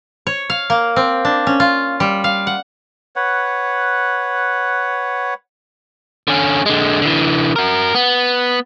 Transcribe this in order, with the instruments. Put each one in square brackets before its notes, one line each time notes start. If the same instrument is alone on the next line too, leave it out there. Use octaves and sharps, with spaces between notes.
[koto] C#5
F5
A#3
C4
D4
C#4
F4
G3
F5
F#5
[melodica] B4 C#5 F#5
[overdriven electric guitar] D3 C#4
D3 G#3
D3 E3
F#4 A#4
B3